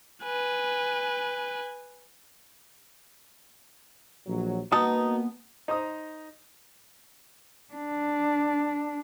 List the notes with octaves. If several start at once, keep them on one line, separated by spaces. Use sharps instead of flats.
B4 G#5
A#1 F#3
A#3 B3 D#4 F#4 A5 D#6
D#4 C5 A#5 D#6
D4